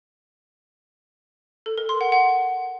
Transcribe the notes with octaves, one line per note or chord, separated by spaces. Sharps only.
A4
A#4
C6
F#5
F#5